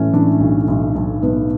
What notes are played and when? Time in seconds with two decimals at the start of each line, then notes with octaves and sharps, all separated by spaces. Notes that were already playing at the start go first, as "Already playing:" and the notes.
Already playing: A2 E3 A3 C#4
0.13 E3 D4
0.40 B1
0.68 B1
0.95 B1
1.23 B1 B3